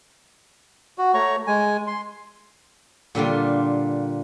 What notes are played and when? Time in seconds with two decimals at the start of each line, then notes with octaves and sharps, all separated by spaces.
0.98 F#4
1.14 A3 C#5 A#5 C#6
1.47 G#3 G#5
1.87 C6
3.15 A#2 D3 G3 F4